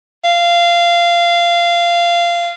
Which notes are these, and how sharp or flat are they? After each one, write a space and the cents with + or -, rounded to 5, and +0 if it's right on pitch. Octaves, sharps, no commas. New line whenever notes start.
F5 -20